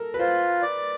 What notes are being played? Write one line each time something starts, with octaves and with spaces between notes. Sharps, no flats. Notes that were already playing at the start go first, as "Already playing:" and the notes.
Already playing: A4 A#4
B4
F4 C5
D5